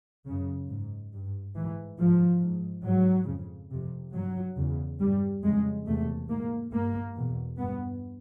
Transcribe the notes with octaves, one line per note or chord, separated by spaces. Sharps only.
F#2 C#3
G#2
G2
G#2 E3
G#2 F3
G#2
G#2 F#3
F2 C#3
F2 C3
G2 F#3
E2 C#3
G2 G3
F2 C#3 G#3
E2 C3 A3
G#2 A#3
G2 A#3
E2 B2
G2 B3